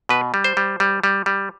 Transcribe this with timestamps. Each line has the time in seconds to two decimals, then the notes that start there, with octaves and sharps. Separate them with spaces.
0.09 B2 B4
0.34 G3
0.44 C5
0.57 G3
0.80 G3
1.04 G3
1.26 G3